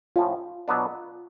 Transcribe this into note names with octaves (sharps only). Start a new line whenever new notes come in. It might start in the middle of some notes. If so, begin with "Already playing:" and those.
A2 F3 A3 C#4 F4
B2 F#3 B3 D4